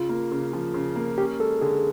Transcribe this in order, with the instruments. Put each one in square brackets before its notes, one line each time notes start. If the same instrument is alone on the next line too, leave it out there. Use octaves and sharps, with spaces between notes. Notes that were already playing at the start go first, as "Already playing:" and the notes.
Already playing: [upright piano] C#3 [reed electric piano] F4
[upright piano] A#3
C#3
F3
C#3
A#3
[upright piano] C#4 [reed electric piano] G4
[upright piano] G#3 [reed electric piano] A4
[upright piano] D3 [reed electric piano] G#4